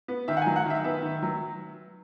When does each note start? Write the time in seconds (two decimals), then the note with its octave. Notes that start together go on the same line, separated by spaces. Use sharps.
0.08 B3
0.28 D#3 E5
0.37 F#5
0.42 G#5
0.46 F#3
0.56 F#5
0.66 D#3 E5
0.84 B3 E5
1.03 D#3
1.22 F#3